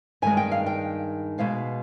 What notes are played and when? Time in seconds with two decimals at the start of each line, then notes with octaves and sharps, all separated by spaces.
0.22 G2 D#3 G#3 G#5
0.37 G5
0.51 F5
0.66 G5
1.38 B2 G#3 B3 F5